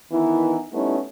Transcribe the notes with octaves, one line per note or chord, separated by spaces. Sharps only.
D#3 E3 B3 D#4 E4
G3 A3 B3 C#4 D#4 E4